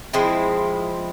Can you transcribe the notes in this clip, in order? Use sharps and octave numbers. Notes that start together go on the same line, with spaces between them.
F3 G#3 C4 E4